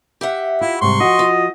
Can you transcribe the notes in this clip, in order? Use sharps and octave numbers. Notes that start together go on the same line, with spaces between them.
G4 E5 F#5
E4 F4
G#2 C3 G3 C6 C#6
F3 F#4 D#5
F4